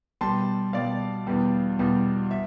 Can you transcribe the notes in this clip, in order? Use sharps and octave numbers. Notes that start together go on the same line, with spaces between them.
G3 A5 C6
B2
B2 G3 D5 F5
E2 B2 G3
E2 B2 G3
E5